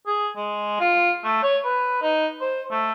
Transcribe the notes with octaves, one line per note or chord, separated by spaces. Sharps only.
G#4
G#3
F4
A3
C#5
B4
D#4
C5
A3